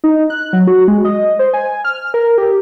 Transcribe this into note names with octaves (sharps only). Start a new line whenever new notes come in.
D#4
F#6
F#3
F#4
G#3
D#5
C5
G#5
F6
A#4
G4